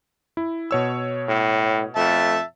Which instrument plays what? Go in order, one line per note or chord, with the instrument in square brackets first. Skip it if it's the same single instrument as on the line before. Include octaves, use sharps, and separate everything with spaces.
[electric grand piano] E4
B2 C#5 E6
[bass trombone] A2
[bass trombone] F2 [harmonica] E5 A5